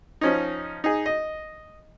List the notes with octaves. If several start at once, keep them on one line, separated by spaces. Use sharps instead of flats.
F3 C#4 D#4
D#4 G#4
D#5